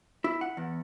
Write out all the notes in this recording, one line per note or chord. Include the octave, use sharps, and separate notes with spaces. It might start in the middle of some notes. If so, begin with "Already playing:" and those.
E4
F#5
E2